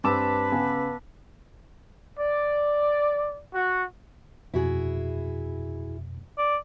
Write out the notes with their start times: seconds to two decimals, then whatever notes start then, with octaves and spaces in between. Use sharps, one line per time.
0.04 G2 G3 C4 B4 A5 D6 E6 E7
0.52 C#3 B3 G#5
2.17 D5
3.54 F#4
4.54 F2 B2 E4 F#4 G#4
6.38 D5